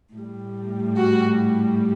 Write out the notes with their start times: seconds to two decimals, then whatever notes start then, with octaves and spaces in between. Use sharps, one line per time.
0.12 A2 G3
0.98 F#4